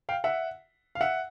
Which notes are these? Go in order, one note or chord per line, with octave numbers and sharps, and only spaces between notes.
F5 G5
E5 F#5
F5
E5 F#5